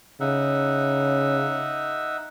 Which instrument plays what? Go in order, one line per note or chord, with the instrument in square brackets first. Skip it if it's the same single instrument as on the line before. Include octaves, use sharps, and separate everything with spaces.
[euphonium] C#3 [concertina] D#4 E5 F#5